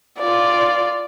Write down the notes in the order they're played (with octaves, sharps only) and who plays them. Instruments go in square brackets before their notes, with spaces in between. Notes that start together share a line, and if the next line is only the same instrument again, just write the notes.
[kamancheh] F4 D5